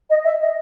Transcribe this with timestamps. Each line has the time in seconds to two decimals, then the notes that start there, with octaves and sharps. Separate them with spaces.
0.10 D#5
0.24 E5
0.40 D#5